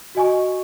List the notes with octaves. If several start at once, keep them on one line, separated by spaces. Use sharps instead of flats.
F#4 D#5 G#5 C#6